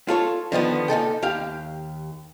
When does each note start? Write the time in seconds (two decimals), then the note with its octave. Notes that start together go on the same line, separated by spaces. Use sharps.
0.08 F4 A4 C#5
0.52 D3 D#3 F3 B3
0.88 A#2 D#4 A4 G5
1.22 D#2 G4 F5 G5